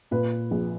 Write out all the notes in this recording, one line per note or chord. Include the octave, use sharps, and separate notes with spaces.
A#2 B4
A#1